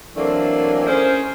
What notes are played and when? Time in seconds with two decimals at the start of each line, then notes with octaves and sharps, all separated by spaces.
0.15 E3 F#3 A3 A#3 C4 D4
0.86 C#4 G#4 A#4 C5